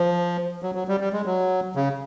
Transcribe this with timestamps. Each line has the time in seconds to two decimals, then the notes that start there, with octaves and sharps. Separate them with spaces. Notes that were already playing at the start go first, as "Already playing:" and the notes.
Already playing: F3
0.63 F#3
0.75 F#3
0.88 G3
1.00 G3
1.13 G#3
1.25 F#3
1.75 C#3